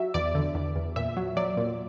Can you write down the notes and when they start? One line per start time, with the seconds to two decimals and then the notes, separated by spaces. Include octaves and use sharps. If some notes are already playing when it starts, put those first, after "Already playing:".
Already playing: F#3 E5
0.14 E2 D5
0.35 D3
0.55 E2
0.76 E2
0.96 A#2 E5
1.17 F#3
1.37 F#3 D5
1.57 A#2